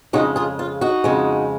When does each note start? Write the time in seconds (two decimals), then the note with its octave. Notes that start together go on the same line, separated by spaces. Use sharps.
0.13 F2 C#3 G#3 D#4 F#4
0.36 F4 G#4
0.59 F4
0.81 D#4 F#4
1.04 F2 C#3 G#3